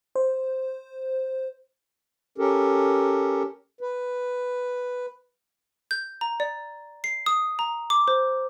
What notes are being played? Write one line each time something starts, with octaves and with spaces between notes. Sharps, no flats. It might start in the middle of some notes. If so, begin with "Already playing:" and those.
C5
C#4 G4 A4 A#4
B4
G6
A#5
D5
C7
D#6
A#5
D6
C5